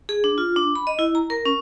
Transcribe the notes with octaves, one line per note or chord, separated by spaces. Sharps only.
G#4
D4
F4
D4
B5
D#5
E4
A#5
A#4
C#4